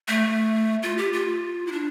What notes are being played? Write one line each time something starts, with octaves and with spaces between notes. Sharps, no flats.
A3
F4
G4
F4
E4
D4